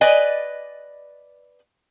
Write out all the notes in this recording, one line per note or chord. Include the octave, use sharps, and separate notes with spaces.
B4 D5 D#5 G#5